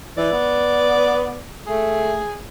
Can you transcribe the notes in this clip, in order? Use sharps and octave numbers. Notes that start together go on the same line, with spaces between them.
E3 D5
B3
A3 G#4